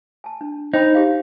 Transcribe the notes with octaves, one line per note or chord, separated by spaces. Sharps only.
G#5 A5
D4
D#4 C5 G5 B5
G4 G#4 F5